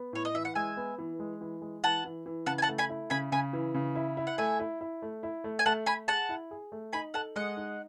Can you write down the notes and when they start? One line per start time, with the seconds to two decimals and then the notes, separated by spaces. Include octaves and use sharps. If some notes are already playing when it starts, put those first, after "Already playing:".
Already playing: B3
0.13 A2 C#5
0.25 D#5
0.35 E3 E5
0.45 F#5
0.55 G#3 E5 G#5
0.77 B3
0.98 E3
1.19 G#3
1.41 E3
1.62 G#3
1.83 E3 F#5 A5
2.05 E3
2.26 E3
2.46 C#3 F#5 A5
2.58 G#5
2.62 F#5 A5
2.68 A3
2.78 G#5 B5
2.89 E4
3.10 C#3 G#5 B5
3.32 C#3 G#5 B5
3.53 E3
3.74 C#3
3.95 E4
4.17 E4
4.27 F#5
4.38 A3 E5 G#5
4.60 E4
4.81 E4
5.02 A3
5.23 E4
5.44 A3
5.59 G#5
5.66 A3 F#5 A5
5.86 A3 G#5 B5
6.08 G#4 F#5 A5
6.29 E4
6.51 G#4
6.72 A3
6.93 D#4 G#5 B5
7.14 A4 F#5 A5
7.36 G#3 D#5 F#5
7.57 D#4